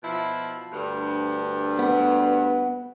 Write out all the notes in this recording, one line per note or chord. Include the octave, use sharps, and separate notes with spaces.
B2 F3 E4
D2 G2
B3